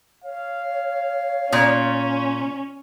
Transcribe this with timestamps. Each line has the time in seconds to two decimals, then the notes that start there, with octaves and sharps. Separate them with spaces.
0.24 C#5 F5
1.52 A#2 C#4